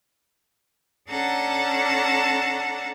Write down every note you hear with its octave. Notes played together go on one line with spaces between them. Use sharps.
C#4 D4 A4 F#5 A5 A#5